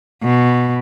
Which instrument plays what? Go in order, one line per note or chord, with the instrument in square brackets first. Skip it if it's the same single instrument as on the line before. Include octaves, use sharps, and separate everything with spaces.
[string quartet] B2